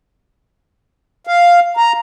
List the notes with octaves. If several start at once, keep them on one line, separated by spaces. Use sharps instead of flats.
F5
A#5